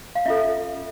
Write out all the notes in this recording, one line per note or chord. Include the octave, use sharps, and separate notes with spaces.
F5
C#4 F4 A4 E5